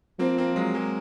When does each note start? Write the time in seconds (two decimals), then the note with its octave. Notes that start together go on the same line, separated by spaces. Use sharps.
0.19 F3 A#3 C4
0.38 A#3 C4
0.56 F#3 G#3
0.74 G#3 A#3